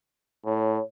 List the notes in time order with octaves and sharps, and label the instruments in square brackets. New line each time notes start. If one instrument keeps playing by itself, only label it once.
[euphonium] A2 [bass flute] C#5